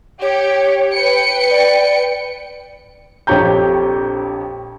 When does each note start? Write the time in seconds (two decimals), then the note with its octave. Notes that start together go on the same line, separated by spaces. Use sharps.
0.22 G4 C#5
0.93 B4 G5 C#7
1.50 D5
3.27 A#1 F2 G4 C#5 A#5 G6